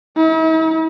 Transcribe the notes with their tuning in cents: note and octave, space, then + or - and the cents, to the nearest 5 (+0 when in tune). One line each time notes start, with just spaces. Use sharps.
E4 -45